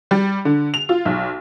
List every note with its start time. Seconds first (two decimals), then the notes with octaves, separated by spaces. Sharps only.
0.11 G3
0.45 D3
0.74 F7
0.89 F4
1.05 B1